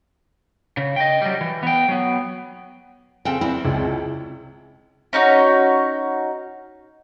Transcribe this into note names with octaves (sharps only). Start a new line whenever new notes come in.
C#3
D#5 G5
F#3 G3
E3
B3 G5
F#3 B3
C#3 C4 A4 G5
E2 C4 D4 E4
C#2
C#4 D#4 F#4 C#5